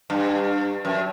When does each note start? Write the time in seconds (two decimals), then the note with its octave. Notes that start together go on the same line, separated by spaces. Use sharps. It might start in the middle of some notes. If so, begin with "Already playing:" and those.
0.10 G2
0.85 F#2